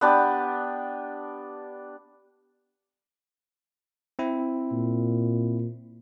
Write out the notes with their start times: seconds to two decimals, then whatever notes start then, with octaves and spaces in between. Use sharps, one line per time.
0.01 B3 D4 G4
4.19 C4 E4
4.72 A#2